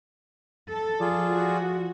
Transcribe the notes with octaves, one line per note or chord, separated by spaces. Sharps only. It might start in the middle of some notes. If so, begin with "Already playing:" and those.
A4
F3 F4 G#4 D5
F#4